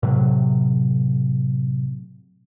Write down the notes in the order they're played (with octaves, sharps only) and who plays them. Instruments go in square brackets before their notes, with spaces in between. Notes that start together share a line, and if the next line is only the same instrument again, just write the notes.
[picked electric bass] A2 C3 F#3